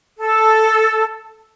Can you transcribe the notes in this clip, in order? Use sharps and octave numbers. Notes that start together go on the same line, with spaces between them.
A4